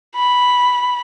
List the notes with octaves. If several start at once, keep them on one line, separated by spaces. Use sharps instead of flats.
B5